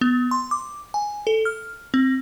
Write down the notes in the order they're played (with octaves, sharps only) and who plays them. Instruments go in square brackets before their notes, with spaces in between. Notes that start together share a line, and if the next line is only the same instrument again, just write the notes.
[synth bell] B3
C6
D6
G#5
A4
F6
C4